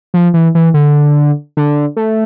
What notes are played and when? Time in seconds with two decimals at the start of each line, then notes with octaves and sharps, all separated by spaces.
0.14 F3
0.34 E3
0.55 E3
0.74 D3
1.57 D3
1.97 A3